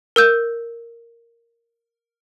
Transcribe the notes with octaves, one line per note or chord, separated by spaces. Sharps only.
A#4 E6 G6